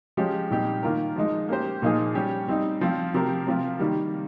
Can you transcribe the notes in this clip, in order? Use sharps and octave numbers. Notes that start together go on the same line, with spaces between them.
F3 G#3 C#4 G4
A#2 G3 C4 D#4 G4
D#3 A#3 F4 A#4
F3 G#3 D#4
A#3 C#4 G4 C5
A#2 F3 A#3 D#4 G#4
G3 C#4 G4 C#5
G3 C4 D#4
F3 C4 F4
C3 F3 C4 G4 A#4
C3 F3 C4 F4
D#3 G3 A#3